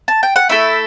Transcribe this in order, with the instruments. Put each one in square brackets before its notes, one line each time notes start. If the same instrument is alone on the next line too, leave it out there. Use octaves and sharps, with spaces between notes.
[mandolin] A5
G5
F#5
A3 E4 A4 E5